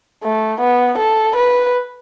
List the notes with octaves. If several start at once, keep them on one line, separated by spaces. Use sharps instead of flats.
A3
B3
A4
B4